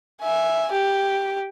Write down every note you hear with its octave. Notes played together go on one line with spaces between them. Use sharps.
E5 G#5
G4